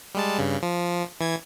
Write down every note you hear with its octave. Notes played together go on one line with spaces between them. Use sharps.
G3 G#3 A5
G2 C#3
F3
E3 G#6